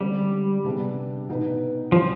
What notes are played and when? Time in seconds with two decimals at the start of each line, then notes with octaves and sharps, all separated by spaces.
0.01 D3 G3 G#3 C4
0.64 C3 G3 B3 D4 G#4
1.29 B2 B3 D#4 B4
1.92 F3 G3 C4 G4 C5